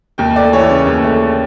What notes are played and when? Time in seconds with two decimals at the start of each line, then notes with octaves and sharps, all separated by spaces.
0.18 D#2 G5
0.36 A3 D5
0.53 E3 C#5
0.70 C#3
0.87 D#2
1.04 A3